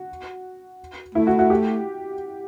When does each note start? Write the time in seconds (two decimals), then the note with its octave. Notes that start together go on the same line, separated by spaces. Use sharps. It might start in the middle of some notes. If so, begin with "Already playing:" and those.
Already playing: F#4
1.15 A3 E4
1.27 F#4
1.39 F#4
1.50 G4